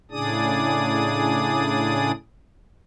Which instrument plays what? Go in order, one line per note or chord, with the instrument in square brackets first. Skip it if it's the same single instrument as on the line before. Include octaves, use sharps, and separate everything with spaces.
[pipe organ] A2 C#3 D4 G#4 D5 D#6